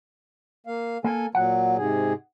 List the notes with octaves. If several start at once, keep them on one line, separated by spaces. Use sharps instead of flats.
A#3 F5
A#3 A4 G#5
A#2 F#3 F#5
G#2 C3 G#4